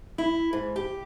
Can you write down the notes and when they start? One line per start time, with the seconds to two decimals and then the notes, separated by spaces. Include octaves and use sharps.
0.18 E4
0.53 G#2
0.76 G4